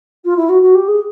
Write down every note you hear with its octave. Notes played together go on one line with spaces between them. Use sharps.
F4
E4
F#4
F#4
G4
G#4